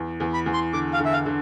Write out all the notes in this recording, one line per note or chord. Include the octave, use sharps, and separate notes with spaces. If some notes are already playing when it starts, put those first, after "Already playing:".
Already playing: E2
E2
B5
E2
C6
D3 D6
F5
D3
E5
F5
D3